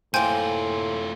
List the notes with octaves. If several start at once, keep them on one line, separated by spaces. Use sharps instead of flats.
A2 A3 A#3 F4 C5 G5 G#5 G6